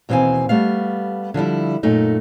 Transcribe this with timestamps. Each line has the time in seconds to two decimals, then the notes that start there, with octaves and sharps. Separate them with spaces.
0.09 D#2 B2 E3 C4 F5 G#5
0.49 G3 A3 B3 F5
1.34 D3 F3 G3 E4
1.83 F#2 A#2 A3 D#4